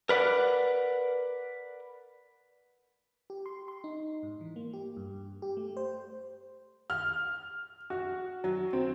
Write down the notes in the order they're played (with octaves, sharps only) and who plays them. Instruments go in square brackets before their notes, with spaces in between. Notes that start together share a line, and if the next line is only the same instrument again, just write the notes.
[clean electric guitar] A#4 B4 D5 F#5
[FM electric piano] G4
C6
C6
D#4
G#2
E3
A#3
G4
G2
G4
A3
C5
[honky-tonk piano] F6
F#4
F#3
C4